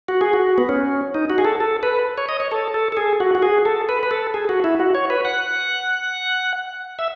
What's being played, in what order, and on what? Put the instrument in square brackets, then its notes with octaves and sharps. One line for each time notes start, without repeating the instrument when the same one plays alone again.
[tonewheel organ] F#4
G#4
F#4
B3
C#4
D#4
F#4
G#4
A4
A4
B4
C#5
D#5
C#5
A4
A4
A4
G#4
F#4
F#4
G#4
A4
B4
B4
A4
G#4
F#4
E4
F#4
C#5
B4
F#5
E5